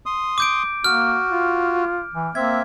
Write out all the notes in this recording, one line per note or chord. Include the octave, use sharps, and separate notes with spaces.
C6 D#6
D6 G6 D7
A#3 F#4 F6
F4
E3
A#3 C4 E5 G#6